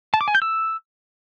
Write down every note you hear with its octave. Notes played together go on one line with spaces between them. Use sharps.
A5
D6
G#5
G6
E6